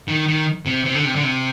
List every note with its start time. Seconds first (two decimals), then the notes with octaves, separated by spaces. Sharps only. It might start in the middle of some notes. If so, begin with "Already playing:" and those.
0.08 D#3
0.27 D#3
0.66 C3
0.85 C3
0.95 D3
1.05 C3
1.15 D3
1.23 C3